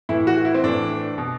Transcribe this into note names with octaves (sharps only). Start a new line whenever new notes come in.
A2 E3 E4
F#4
E4
C4
A2 E3 D4
B2